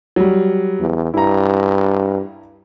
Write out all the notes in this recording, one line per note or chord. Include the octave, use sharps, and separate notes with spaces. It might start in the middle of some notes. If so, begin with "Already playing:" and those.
F#3 G3
E2
G2 E4 A#5